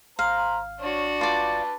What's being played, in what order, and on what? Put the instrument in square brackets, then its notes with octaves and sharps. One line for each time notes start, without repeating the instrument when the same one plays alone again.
[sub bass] G#1 [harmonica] C5 A#5 [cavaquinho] F5
[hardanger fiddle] D4 F#4 [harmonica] C#5
[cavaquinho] F4 D5 [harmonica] B4 A5 D6